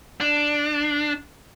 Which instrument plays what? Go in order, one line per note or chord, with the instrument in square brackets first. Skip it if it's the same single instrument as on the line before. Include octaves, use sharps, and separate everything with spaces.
[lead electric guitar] D4